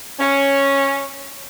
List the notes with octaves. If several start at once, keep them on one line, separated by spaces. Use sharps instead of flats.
C#4